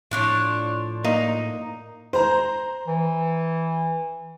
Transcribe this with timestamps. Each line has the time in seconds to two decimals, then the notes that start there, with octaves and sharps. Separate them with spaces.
0.11 A2 F3 D4 C#5
1.04 A#3 D#4
2.13 C5 A#5
2.88 E3